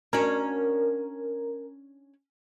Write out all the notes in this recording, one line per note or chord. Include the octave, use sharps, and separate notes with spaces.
C#4 D4 F#4 A#4